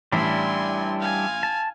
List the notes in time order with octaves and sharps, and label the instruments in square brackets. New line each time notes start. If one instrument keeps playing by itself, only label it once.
[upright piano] A1 [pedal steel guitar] G3 D4 E4 [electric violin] G#5 C6
[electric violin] F5 G#5
[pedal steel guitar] A5